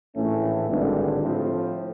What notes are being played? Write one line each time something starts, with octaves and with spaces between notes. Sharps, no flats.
A#1 A2 E3 A3 C#4
G#1 G2 D3
A2 F3 A3 C4